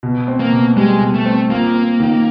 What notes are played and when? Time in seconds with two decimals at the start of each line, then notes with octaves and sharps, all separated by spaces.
0.03 B2
0.28 C4
0.40 A#3
0.52 B2
0.76 G3 G#3
1.01 B2
1.14 A3
1.26 C4
1.50 A#3 F4
1.74 C4
2.00 D#3